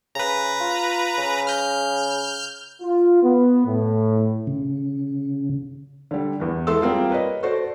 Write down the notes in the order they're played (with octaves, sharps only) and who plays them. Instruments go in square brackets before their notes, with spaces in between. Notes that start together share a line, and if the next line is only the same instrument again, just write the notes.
[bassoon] C#3 [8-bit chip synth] B4 A#5
[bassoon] F4
C#3
[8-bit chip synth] F6 G6
[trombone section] F4
B3
A2
[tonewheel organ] C#3
[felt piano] D3 G3
E2 E3
E3 G#3 A4 E5 C6 E6
G3 A#3 C4 F4 G#4
A#4 B4 C#5 D#5
F#4 A4 C5 D5